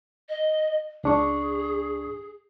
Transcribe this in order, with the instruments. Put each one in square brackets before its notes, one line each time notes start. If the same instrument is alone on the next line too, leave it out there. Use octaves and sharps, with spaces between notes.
[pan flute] D#5
[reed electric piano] C#2 D4 C#6 [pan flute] G#4